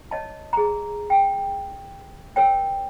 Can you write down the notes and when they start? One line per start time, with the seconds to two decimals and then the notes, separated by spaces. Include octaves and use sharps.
0.11 C#5 D#5 A5
0.53 G#4 A#5
1.10 G5
2.36 A#4 C#5 G5